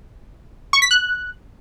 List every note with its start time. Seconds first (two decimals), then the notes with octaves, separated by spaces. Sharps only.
0.73 C#6
0.82 B6
0.91 F#6